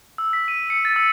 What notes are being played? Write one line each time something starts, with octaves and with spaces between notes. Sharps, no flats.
E6
B6
D#7
C#7
A6
E6